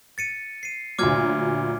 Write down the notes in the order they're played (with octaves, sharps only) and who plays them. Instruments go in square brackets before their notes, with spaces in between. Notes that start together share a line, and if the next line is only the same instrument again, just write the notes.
[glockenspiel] A6 C#7 D#7
C7 D#7
[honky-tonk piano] D2 A#2 F#3 [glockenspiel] D6 F6 G#6